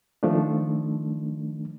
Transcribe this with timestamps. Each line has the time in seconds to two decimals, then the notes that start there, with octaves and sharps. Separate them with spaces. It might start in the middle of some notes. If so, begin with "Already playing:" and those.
0.23 D#3 F3 A3 D4